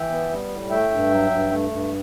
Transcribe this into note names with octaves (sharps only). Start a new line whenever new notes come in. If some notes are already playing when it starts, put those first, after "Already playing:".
Already playing: E3 E5 G5
B3
G3
A2
A3 E5 G5
G2
F#3
G2
A3
G2